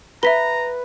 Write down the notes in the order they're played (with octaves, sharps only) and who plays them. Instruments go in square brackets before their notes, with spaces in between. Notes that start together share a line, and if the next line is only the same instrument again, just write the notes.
[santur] B4 [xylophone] E5 B6 G7 [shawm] A#5